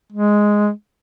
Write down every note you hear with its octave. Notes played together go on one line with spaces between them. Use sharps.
G#3